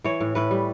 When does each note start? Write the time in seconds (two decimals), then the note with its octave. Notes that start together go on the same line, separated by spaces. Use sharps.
0.04 E3 C#5
0.20 A2
0.35 A2 B4
0.51 G3